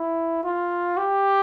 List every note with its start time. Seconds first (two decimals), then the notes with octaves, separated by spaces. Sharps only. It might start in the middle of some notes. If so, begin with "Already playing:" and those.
Already playing: E4
0.44 F4
0.98 G4